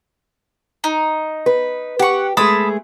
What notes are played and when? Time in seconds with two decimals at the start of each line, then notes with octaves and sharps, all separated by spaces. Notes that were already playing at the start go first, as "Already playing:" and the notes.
0.84 D#4
1.46 B4
1.99 G4 F#5 C#6
2.37 G#3 A3 G#4 A5 B5 D#6